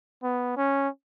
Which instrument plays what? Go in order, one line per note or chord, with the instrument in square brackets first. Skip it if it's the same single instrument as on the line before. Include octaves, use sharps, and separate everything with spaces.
[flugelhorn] B3
C#4